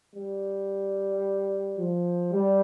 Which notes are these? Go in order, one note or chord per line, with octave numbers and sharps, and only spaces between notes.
G3
F3
G3